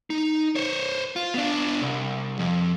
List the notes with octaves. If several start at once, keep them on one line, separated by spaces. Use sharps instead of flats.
D#4
C5 C#5
F4
B3 D4
C2
F2